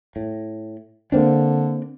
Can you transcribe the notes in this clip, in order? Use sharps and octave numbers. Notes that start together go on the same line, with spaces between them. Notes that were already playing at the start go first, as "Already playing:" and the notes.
A2
D3 A#3 C4 D4